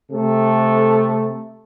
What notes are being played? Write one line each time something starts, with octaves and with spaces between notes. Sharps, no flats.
C3 A3 A4